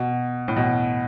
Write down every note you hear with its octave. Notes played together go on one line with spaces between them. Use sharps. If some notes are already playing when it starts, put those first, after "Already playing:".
Already playing: B2
A2
B2